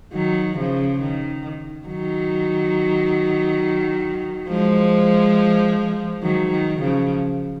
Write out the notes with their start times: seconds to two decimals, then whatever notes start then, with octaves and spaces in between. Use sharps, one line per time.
0.13 D#3 F#3
0.57 C#3 F3
1.01 D#3
1.87 D#3 F#3
4.48 F3 G#3
6.22 D#3 F#3
6.51 D#3
6.80 C#3 F3